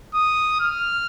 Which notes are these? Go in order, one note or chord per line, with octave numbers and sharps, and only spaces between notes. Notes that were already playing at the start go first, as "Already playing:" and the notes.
D#6
F6